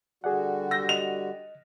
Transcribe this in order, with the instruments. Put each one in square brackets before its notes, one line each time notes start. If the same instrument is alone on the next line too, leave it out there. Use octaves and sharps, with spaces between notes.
[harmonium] D3 G3 F#4 [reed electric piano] G#4 D5 F#5
[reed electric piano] E6 G6 [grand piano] A#6
[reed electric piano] D#5 [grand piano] F7